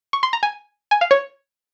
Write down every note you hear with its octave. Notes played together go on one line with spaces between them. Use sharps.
C#6
C6
A#5
G#5
G#5
F5
C#5